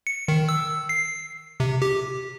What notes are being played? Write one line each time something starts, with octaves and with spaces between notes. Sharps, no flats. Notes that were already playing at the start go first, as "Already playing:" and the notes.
C#7
D#3
E6
C7
C3
G4